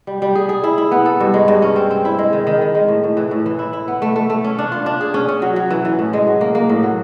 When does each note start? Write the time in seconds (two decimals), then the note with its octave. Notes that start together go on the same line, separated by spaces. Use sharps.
0.07 G3
0.22 G3
0.35 G#4
0.49 G#4
0.64 E4
0.78 E4
0.92 B3
1.06 A4
1.20 G2
1.34 G#3
1.48 G2
1.62 C#4
1.76 C4
1.91 C4
2.05 E4
2.19 G#3
2.33 D#3
2.47 D#3
2.61 D#3
2.75 G#3
2.88 A2
3.04 A2
3.17 E3
3.31 A2
3.46 E3
3.59 E4
3.73 E4
3.88 B3
4.02 A3
4.16 A3
4.30 A3
4.44 C#4
4.59 D4
4.72 F4
4.86 D4
5.01 G#4
5.14 C#4
5.28 C#4
5.42 F#3
5.56 F#3
5.71 E3
5.85 E3
5.99 A2
6.13 G#3
6.27 F#3
6.41 A#3
6.55 A#3
6.69 A2
6.83 F#3